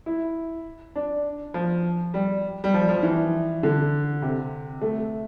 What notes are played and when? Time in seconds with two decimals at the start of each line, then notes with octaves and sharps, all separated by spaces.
0.06 E4
0.96 D4
1.54 F3
2.14 G3
2.64 G3
2.74 F3
2.89 F3
3.03 E3
3.63 D3
4.22 C3
4.81 A3